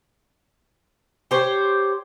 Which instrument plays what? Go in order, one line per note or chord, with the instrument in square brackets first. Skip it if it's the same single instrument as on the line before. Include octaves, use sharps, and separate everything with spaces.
[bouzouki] G4 C5 C#5